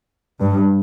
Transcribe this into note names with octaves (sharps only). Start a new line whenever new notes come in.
G2